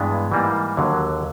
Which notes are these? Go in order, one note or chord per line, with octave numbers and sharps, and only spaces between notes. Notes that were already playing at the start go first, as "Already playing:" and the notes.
Already playing: G2 E3 G#3 B3 D4
G#2 E3 G3 A#3
D#2 D3 F#3